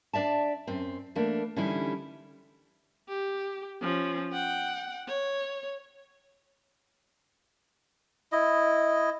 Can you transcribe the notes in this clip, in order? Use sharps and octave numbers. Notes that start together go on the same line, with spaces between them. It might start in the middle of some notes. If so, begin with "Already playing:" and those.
D4 D5 E5 A5
F#2 C4
E3 A3 A#3 D4
D3 E3 G3 C#4 D#4 E4
G4
F3 C#4
F#5 G5
C#5
E4 D#5